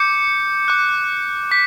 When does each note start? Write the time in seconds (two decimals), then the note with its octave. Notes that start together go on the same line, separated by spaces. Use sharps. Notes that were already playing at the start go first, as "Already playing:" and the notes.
Already playing: D6 G6 C#7
0.68 D6 F#6
1.51 D6 G6 B6